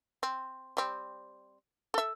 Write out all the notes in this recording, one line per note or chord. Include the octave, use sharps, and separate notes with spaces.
C4
G3 C4
A4 E5